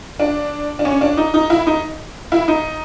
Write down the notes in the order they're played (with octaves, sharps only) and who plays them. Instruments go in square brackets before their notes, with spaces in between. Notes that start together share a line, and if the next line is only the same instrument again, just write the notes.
[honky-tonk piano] D4
D4
C#4
D4
D#4
D#4
E4
D#4
E4
D#4